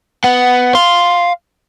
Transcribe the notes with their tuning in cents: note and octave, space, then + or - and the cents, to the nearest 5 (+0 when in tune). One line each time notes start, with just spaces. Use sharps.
B3 +10 F#5 +5
F5 +0 C6 +0